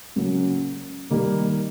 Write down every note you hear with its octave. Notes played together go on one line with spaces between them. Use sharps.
C#3 F#3 A#3 C#4
D#3 G3 A#3